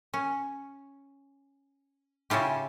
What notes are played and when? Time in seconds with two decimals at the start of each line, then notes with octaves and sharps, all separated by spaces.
0.14 C#4
2.30 C#3 C#4 E4 F4 G4